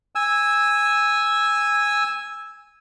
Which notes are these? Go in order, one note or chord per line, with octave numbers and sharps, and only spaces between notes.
G#5 E6